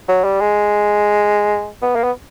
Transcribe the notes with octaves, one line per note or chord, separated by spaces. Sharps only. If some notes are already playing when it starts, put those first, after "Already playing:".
F#3
G3
G#3
B3
A#3
B3